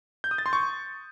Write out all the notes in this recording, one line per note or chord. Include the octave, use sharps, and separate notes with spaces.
G6
D#6
A6
C6
C#6